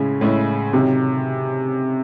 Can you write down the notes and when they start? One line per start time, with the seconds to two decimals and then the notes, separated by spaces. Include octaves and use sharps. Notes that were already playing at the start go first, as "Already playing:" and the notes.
Already playing: A2 C#3 G#3 C#4 E4
0.21 A2 G#3 C#4 E4
0.73 C3 D#3 F#3 C#4